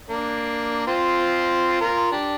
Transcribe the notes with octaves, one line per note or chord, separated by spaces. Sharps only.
A#3 D4
C4 F4
F4 A#4
D4 G4